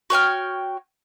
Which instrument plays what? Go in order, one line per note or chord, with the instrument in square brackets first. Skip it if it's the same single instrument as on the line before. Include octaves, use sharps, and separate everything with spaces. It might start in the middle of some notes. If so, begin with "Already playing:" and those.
[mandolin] F#4 C#5 G5 F6